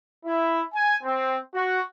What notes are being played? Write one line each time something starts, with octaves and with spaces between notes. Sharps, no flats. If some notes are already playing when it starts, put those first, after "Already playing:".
E4
G#5
C4
F#4